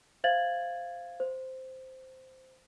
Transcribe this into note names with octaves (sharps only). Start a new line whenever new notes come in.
C5 E5 F5 G#6 A6 F#7
C5